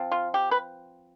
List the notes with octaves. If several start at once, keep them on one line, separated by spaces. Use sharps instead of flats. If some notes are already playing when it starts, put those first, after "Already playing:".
Already playing: F3 C4
F4
G4
B4